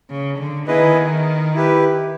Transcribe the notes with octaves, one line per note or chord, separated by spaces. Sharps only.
C#3
D3
D#3 B3 E4 G#4 B4 D#5
E4 G4 B4